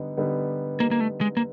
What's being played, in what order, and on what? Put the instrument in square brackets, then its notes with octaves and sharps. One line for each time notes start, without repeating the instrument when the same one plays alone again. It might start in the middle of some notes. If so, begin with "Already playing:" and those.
Already playing: [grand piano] D3 G3 B3 D#4
D3 G3 B3 D#4
[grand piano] D3 G3 B3 D#4 [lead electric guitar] A#3
[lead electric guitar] A#3
A3
G#3
A#3